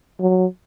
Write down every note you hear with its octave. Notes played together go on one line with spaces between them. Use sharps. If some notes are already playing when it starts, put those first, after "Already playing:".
F#3